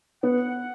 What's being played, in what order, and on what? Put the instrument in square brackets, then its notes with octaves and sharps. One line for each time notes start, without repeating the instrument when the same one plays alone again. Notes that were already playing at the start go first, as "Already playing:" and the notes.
[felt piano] B3 [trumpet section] F#5